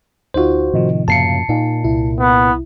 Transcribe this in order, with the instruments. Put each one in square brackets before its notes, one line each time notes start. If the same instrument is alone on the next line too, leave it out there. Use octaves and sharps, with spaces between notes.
[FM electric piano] D2 D#4 F4 [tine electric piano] F#4 C5
[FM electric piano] A2 C3 F3 [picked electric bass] D#3
[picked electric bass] F#2 C#3 A#3 [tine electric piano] A5 C7 C#7
[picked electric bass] A#2 [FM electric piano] D#4
[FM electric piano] C2 E4
[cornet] B3